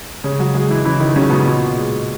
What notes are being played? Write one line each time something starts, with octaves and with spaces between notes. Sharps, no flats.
C#3 C#4
F#3 F#4
F#3 G#3 G#4
E3 E4
C#3 E3 E4
D#3 D#4
C#3 F#3 C#4
B2 B3
A#2
G#3